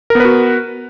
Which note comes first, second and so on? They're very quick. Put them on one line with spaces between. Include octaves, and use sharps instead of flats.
A#4 B3 B4 F#4